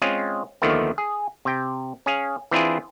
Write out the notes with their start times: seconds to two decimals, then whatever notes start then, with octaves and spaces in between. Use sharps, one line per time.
0.02 G#3 C4 C#4 F4 G#4
0.62 D#2 D3 D#3 F3 A3 B3
0.98 G#4
1.45 C3 G5
2.06 C#4 G#4 F5
2.51 E3 C4 D4 E4 F4 G#4